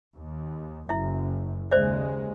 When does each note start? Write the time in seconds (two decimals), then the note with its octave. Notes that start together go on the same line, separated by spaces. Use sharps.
0.16 D#2
0.89 F#1 F#2 E4 E5
1.71 D#2 C#3 G#3 C5 D5 E5